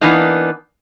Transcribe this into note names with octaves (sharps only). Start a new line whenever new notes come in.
E3 A#3 B3 D4 D#4